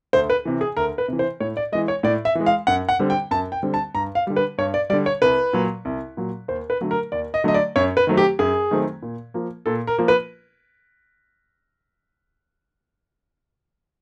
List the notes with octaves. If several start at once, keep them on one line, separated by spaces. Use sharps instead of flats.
D2 C5
B4
C3 E3
G#4
D2 A#4
B4
C3 E3
C5
A2 C#5
D5
E3 G#3 D#5
C#5
A2 D5
E5
E3 G#3
F5
F#2 F#5
F#5
D3 G3 C4
G5
F#2 A5
G5
D3 G3 C4
A5
G2 A#5
F5
D3 G3
B4
G2 C#5
D5
D3 G3 D5
C#5
C2 B4
A#2 F#3
C2
A#2 F#3
D#2 C5
B4
D3 F#3 A3
A#4
D#2 D5
D#5
D3 F#3 A3 D#5
D5
F#2 C#5
B4
D#3 F#3 A3 C4
G4
F#2 G#4
D#3 F#3 A3 C4
A#2
F3 A#3
A#2 A4
A#4
F3 A#3
B4